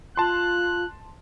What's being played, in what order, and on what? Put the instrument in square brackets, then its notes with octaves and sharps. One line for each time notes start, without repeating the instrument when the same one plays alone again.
[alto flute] F4 [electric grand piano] A5 C6 [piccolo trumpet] F#6